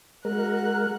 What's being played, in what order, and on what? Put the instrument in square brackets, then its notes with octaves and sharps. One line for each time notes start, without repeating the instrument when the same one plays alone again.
[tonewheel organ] G#3 A#4 [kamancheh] F#4 F#6